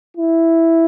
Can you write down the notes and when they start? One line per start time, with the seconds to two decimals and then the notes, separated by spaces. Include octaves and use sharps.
0.17 E4